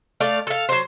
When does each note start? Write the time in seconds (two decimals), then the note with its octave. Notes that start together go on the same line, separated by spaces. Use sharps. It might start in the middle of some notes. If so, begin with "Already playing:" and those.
0.20 A3 D5 F5
0.47 A4 F5
0.69 F#3 C5